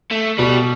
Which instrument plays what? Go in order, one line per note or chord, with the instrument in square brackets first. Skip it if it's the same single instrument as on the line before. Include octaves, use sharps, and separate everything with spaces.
[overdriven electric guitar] A3
[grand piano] B2 [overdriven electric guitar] G3